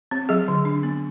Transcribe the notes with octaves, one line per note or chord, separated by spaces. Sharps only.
C4
F#3 G#4
D3
D4
B3